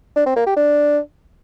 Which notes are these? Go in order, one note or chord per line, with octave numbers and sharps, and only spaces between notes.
D4
C4
A#3
G4
D4